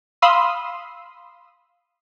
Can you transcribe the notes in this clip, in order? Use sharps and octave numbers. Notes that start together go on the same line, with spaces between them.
F5 B5 C6 D#6 E6